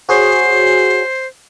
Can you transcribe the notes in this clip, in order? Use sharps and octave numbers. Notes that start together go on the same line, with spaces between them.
F#4 G#4 C5 C#5